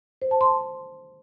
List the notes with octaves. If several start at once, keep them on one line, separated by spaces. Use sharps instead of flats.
C5
A5
C6